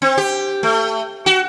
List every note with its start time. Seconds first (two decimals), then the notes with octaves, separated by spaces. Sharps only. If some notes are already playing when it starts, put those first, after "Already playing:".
0.02 C4
0.17 G4
0.63 A3
1.26 F#4